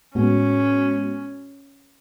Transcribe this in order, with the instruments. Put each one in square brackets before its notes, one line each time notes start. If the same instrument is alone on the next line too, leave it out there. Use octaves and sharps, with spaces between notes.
[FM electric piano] A2 G#3 B3 F#4 [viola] C#4